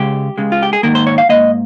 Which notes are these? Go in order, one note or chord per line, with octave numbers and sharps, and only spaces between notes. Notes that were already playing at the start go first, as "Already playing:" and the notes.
Already playing: C#2 C#3 G#3 G4
C#2 C#3 G#3
F4
G4
G#4
G#2 D#3 A#3 A#4
C5
C#5
F5
G#2 D#3 A#3 D#5